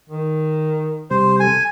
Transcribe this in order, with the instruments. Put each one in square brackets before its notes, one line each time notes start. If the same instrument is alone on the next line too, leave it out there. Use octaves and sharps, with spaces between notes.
[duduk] D#3
[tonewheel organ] C3 G3 [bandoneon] C5
[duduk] A4 [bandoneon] G#5